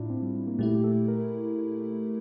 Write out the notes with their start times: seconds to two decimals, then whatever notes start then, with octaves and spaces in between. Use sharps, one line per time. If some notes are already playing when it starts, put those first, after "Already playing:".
Already playing: A2 D4 E4 F4
0.10 C4
0.22 G3
0.35 G3
0.47 A#3
0.59 A#2 A3 E4 G4
0.75 G4
0.84 A4
1.08 A#4